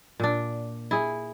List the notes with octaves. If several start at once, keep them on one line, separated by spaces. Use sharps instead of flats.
A#2 D4
E4 G#4